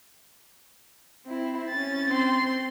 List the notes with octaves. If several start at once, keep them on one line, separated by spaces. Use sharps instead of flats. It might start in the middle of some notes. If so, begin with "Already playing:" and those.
C4 E4
C#4 A6
C4 C6